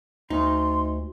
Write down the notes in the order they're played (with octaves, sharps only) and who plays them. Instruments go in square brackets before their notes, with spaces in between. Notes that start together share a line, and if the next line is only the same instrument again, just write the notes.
[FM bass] D2 [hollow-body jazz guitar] D#4 [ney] C6